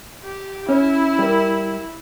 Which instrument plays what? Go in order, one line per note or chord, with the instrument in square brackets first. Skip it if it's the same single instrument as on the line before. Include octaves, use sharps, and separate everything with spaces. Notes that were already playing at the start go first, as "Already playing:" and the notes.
[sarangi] G4
[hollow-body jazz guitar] C#4 [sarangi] E4
[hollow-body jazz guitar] G3 A#4